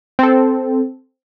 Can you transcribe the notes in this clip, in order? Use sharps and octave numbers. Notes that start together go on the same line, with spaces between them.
C4 A4